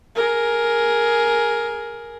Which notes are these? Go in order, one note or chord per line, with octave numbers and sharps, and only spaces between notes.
G#4 A#4